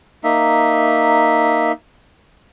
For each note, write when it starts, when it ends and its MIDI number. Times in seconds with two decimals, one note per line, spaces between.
0.24 1.72 58
0.24 1.72 63
0.24 1.72 76